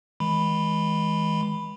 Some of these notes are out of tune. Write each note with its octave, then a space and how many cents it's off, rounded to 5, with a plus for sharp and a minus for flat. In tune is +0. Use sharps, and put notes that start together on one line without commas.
E3 -30 G#3 +0 B5 +0